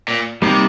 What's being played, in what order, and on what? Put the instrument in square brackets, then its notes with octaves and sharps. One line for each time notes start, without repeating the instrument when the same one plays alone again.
[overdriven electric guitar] A#2
[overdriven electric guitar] C3 [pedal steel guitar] G3 A#3 D#4 A#4 D5